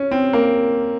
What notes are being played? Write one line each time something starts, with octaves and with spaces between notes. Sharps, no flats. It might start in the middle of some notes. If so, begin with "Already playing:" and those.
Already playing: C#4
C4
A#3